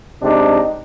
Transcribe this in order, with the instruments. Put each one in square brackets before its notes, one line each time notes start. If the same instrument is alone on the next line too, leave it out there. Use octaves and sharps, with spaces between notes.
[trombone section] C3 G#3 D4 D#4